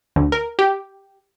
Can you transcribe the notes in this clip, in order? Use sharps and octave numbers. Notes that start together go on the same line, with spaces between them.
D2
A#4
G4